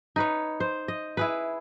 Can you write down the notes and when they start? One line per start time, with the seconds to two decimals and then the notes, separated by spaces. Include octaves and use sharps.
0.16 D#4 B4 C#5
0.60 C5
0.88 D#5
1.17 E4 G#4 B4